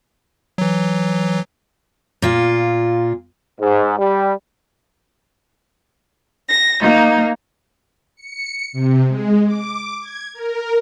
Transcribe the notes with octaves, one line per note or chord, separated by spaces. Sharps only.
E3 F#3
A#2 F4
G#2
G3
A#6
A#3 D#4
C#7
C3
G#3
D6
G#6
A#4